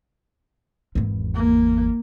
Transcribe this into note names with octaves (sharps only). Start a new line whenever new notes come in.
G#1 E2
A#3